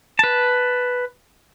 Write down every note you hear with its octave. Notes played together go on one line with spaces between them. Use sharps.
B4 A5